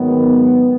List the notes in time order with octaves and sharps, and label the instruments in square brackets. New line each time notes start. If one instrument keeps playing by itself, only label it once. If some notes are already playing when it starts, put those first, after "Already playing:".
Already playing: [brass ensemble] G#2 D#3 F#3 B3